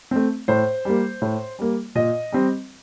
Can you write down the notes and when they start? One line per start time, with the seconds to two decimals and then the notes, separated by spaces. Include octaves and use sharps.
0.11 A3 C4
0.48 A2 C5
0.85 G3 A#3
1.22 A2
1.59 G3 A#3
1.95 A#2 D#5
2.32 G3 C4